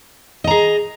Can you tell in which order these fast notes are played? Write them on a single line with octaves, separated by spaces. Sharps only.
D#5 A#5 G#4